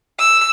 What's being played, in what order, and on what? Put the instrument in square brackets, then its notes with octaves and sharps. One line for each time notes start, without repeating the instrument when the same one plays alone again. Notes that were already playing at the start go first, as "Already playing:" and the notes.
[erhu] E6